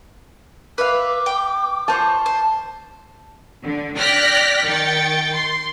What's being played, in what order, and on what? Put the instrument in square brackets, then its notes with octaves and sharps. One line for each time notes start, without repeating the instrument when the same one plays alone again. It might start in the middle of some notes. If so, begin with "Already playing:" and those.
[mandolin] B4 E5 F5 [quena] D6
[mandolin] G5
[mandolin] F4 C5 C#5 [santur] A5
[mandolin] C5
[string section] D3
D5 G5 F6 F#6 A#6 B6
D#3 G5 A6 C#7
C6